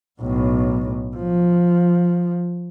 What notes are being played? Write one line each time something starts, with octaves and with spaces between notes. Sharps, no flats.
B1 A2
F3